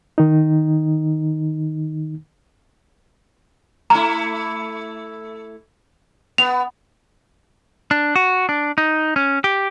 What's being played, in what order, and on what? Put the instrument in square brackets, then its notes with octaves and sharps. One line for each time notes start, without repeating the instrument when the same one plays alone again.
[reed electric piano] D#3 D#4
[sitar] A3 E4 [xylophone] A#5
[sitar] B3 [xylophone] F7
[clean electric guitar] D4
F#4
D4
D#4
C#4
G4